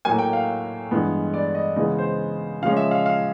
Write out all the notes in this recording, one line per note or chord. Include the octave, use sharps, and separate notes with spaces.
A2 F#3 A#3 G#5
G5
F5
G2 E3 G#3 B3
D5
D#5
C#3 E3 G#3 B3 D#5
C5
C#3 F3 G#3 C#4 F5
E5
F5
F5